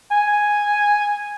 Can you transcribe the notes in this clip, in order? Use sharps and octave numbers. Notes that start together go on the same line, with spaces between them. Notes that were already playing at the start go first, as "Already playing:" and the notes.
G#5